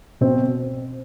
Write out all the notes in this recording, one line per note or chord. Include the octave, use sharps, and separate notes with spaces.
B2 C4